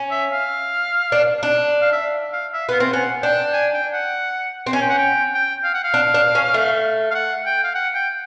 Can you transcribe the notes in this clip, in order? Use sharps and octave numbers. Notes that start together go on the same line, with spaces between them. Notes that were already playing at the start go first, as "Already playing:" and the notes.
Already playing: C#4
E5
F5
D4
D4
F5
E5
F5
E5
B3 F5
C4
C#4 F#5
D4 G5
G#5
G5
F#5
C4
C#4 G#5
G5
F#5
G5
G5
F5
F#5
F5
D4
D4
C#4
A3
F5
F#5
G5
F5
F#5
G5